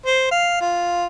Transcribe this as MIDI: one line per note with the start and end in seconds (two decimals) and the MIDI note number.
0.06 0.27 72
0.32 0.58 77
0.61 1.06 65